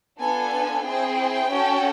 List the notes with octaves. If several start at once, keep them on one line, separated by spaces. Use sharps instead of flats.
B3 D4 F4 A4 G#5
C4 E4 G#4 G5
C#4 F#4 A4